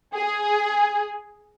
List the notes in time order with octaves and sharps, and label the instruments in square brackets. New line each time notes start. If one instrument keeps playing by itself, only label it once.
[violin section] G#4